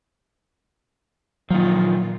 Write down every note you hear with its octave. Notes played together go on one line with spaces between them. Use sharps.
A#2 D#3 F3 F#3 F4